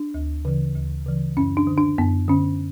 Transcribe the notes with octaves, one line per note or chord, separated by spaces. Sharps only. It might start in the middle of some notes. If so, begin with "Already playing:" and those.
Already playing: D4
D2
C#3 E3
D2
C#3 E3
F#2 C#4
D4
D3
D4
F#2 B3
D3 C#4